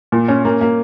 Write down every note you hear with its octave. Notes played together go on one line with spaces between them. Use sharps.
A#2
C#4
A#3
A#3